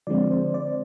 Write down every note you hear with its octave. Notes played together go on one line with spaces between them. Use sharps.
D3 F3 G#3 C4 D5
C5
D5